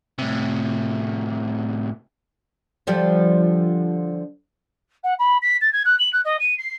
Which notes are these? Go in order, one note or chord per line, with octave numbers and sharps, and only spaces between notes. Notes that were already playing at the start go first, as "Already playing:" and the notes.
A2 C3
D3 F3 G3
F#5
B5
B6
A6
G#6
F#6
F#7
F#6
D#5
D#7
C7